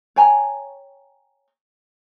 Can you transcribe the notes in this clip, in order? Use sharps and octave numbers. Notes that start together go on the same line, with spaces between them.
C#5 G5 G#5 A#5